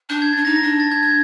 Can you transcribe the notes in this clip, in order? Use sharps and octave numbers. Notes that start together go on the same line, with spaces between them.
D4 G6
G#6
A6
D4
D#4 A#6
A#6
D4
A6
G#6
G#6